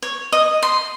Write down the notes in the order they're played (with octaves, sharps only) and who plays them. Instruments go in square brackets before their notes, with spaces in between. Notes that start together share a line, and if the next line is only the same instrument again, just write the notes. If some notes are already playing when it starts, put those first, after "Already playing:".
[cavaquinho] C#5
D#5
C6